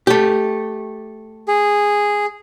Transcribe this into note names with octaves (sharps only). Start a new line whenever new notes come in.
A3 G4
G#4